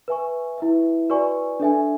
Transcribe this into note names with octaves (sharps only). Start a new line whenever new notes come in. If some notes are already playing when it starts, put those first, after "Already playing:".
B4 E5 G#5 C#6
E4 B4 E5
F#4 B4 D5 G#5 C#6
D4 A4 E5 G#5